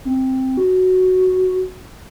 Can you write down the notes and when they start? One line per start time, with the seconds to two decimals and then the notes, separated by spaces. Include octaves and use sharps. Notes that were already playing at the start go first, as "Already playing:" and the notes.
0.05 C4
0.57 F#4